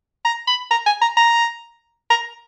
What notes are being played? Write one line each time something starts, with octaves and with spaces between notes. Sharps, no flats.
A#5
B5
A#5
G#5
A#5
A#5
A#5